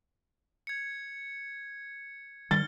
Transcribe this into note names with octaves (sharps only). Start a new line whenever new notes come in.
G#6 C#7
D#3 G3 F6 A6 G7